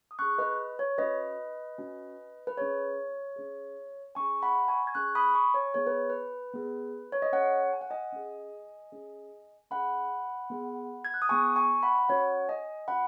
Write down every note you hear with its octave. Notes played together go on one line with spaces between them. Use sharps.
D#6
C#4 G#4 C#6 F#6
B4 D#5
C#5
C#4 F#4 B4 D#5
C#4 F#4
B4
C#4 G#4 C#5
C#4 G#4
C#4 G#4 G#5 C#6
F#5 B5
G#5 C#6
G#6
C#4 G#4 C#6 F#6
B5 D#6
G#5 C#6
C#5
B3 G#4 C#5
B4
B4
B3 G#4
C#5
D#5
C#4 G#4 C#5 F#5
G#5
F#5
D#5 G#5
C#4 G#4
C#4 G#4
C#4 G#4 F#5 B5
B3 G#4
G#6
F#6
D#6
B3 G#4 G#5 C#6
G#5 C#6
F#5 B5
C#4 F#4 C#5 F#5
D#5 G#5
C#4 F#4 F#5 B5